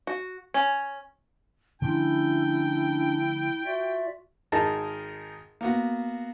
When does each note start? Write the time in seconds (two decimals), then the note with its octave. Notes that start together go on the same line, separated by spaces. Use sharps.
0.07 F#4
0.54 C#4
1.82 D3 F3 A3 C#4 D4 E4 G5
3.65 F4 F#4 D5 E5
4.52 G#1 D#4 G#4 A#4 A5
5.61 A#3 B3 F#4